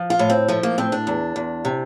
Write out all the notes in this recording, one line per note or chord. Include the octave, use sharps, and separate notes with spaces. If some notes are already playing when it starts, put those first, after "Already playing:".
Already playing: F3
F4
A2
C4
F3 A3
A#3
A2 C4
D4
E2
E2
C3